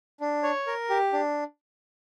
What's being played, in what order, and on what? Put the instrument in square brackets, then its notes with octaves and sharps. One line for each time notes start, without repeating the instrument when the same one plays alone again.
[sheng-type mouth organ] D4
C#5
A#4
G4
D4